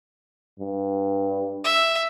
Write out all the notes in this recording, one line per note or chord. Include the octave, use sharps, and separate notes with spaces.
G2
E5